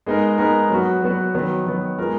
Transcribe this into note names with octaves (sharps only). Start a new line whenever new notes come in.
G#3 B3 D#4 A#4
G#3 B3 D#4 A#4
F#3 B3 F#4
F#3 B3 F#4
D#3 F#3 B3
D#3 F#3 B3
G#3 B3 F4 A#4